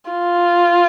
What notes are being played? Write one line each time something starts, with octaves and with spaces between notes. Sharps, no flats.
F4